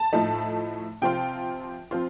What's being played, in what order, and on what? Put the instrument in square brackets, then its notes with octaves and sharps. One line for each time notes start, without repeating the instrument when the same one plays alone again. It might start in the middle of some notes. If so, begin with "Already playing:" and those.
Already playing: [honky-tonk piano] A5
A2 F3 A3 D#4
C3 F3 C4 F4 G5
F3 C4 F4